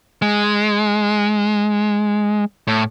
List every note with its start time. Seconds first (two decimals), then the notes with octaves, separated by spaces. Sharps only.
0.22 G#3
2.67 A2